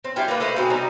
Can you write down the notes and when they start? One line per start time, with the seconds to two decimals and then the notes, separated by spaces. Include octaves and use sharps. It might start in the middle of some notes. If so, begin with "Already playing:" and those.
0.04 C4
0.16 G3 E4 F4 G5
0.28 A#3 F4 B4
0.40 A3 D#4 B4 C5
0.56 B2 C4 G#4
0.70 C3 G3 D#4